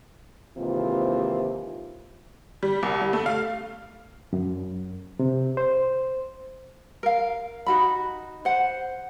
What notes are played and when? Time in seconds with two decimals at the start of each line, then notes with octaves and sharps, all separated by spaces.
0.58 D#2 G#2 C3 E3 F4
2.63 G3
2.83 C2
3.01 G3
3.13 A3
3.26 F5
4.33 F#2
5.19 C3
5.57 C5
7.03 A#4 F5
7.66 D#4 F#4 B5
8.45 C5 F#5